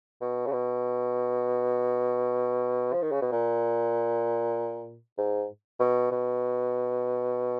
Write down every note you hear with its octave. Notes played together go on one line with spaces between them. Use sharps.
B2
C#3
B2
F3
D#3
C#3
B2
A#2
G#2
B2
B2